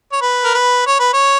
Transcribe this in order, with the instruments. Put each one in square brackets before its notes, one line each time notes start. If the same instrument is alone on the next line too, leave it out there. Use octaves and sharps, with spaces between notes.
[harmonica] C#5
B4
A#4
B4
C#5
B4
C#5